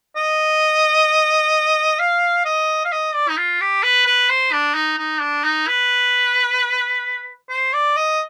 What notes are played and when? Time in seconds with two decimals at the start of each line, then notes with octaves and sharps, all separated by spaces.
0.16 D#5
2.00 F5
2.45 D#5
2.85 F5
2.92 D#5
3.14 D5
3.29 D#4
3.37 F4
3.61 G4
3.83 B4
4.06 B4
4.30 C5
4.52 D4
4.75 D#4
4.98 D#4
5.21 D4
5.44 D#4
5.67 B4
7.50 C5
7.73 D5
7.97 D#5